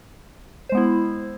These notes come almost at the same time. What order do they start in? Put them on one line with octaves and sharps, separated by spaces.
C5 G#3 B3 E4